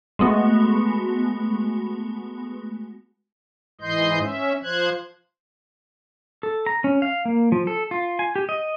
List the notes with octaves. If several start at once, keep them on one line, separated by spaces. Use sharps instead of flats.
G#3 A3 B3 F#4
G#2 E3 D#5 C6 G6
C#4 E5
F3 C5 F#6 G#6
A4
A#5
C#4
F5
A#3
F3
A4
F4
G#5
G4
D#5